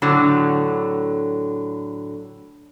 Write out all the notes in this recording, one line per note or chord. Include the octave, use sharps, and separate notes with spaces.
A2 D3 F#3